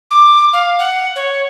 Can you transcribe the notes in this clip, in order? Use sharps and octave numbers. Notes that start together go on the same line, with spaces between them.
D6
F5
F#5
C#5